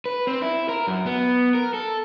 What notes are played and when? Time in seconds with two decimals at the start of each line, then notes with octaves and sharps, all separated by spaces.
0.06 B4
0.27 C4
0.42 E4
0.69 A#4
0.87 F#2
1.06 B3
1.55 A#4
1.74 A4